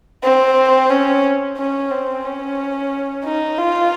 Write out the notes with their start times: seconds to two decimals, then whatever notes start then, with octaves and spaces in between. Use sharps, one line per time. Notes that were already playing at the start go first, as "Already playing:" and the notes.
0.24 C4
0.90 C#4
1.57 C#4
1.91 C4
2.25 C#4
3.25 D#4
3.58 F4